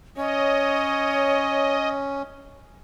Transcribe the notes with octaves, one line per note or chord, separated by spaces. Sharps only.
C#4 C#5 D#5